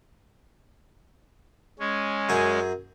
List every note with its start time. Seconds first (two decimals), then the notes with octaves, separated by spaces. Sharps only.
1.79 G#3 C#4
2.29 F#2 G#4